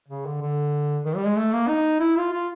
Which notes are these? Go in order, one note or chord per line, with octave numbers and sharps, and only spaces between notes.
C#3
D3
D3
D#3
G3
G#3
A3
A#3
D#4
E4
F4
F4